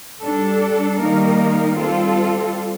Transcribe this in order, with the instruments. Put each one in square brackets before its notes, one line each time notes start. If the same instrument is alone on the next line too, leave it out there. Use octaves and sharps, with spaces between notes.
[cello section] G3 D4 A4
D#3 G3 A#3 D#4 A#4
G3 C4 F4 A4